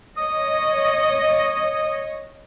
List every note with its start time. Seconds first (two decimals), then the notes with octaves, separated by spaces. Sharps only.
0.18 C#5 D#5 D#6